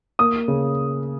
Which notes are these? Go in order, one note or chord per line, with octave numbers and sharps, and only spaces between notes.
A#3 D#6
C#3